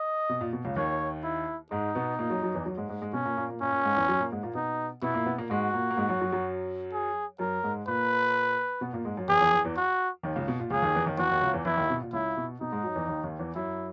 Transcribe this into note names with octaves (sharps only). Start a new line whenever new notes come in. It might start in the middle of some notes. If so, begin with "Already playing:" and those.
Already playing: D#5
B2
A#2
B2
C#2 C#3
D#2 D#3 C#5
E4
G#2 G#3 D#4
B2 B3
A#2 A#3
F#2 F#3
F#2 F#3
E2 E3
F#2 F#3
G#2 G#3
G#2 G#3
G#2 G#3
B2 B3 C#4
A#2 A#3
A#2 A#3
A#2 A#3
A#2 A#3 C#4
A#2 A#3
G#2 G#3
E2 E3
F#2 F#3
A#2 A#3
G#2 G#3
A#2 A#3
B2 B3 D#4
B2 B3 E4
A#2 A#3
B2 B3
A#2 A#3
G#2 G#3 F#4
A#2 A#3
A#3
G#2 G#3
F#2 F#3
F#2 F#3
F#2 F#3
G#4
F#2 F#3 A#4
G#2 G#3
A#2 A#3 B4
B2 B3
A#2 A#3
G#2 G#3
F#2 F#3
E2 E3 G#4
E2 E3
E2 E3
E2 E3
F#4
D#2 D#3
C#2 C#3
B2
A#2
C#2 C#3 G#4
D#2 D#3
E2 E3
D#2 D#3
E2 E3 F#4
D#2 D#3
C#2 C#3
E2 E3
E2 E3 E4
D#2 D#3
B2
A#2
C#2 C#3 E4
B2
B2 D#4
G#2 G#3
F#2 F#3
E2 E3
D#2 D#3
D#2 D#3
E2 E3
F#2 F#3 E4